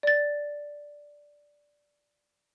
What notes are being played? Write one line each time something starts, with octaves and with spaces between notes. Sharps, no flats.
D5 A6